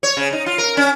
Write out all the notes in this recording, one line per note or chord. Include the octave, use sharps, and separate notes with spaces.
C#5
C#3
D#4
F4
A#4
C#4